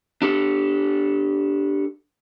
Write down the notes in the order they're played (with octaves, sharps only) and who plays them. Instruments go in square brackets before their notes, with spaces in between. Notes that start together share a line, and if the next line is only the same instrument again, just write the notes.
[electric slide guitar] D4 G4 A4